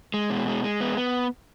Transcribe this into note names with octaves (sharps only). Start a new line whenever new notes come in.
G#3
B2
G#3
G#3
B3
B3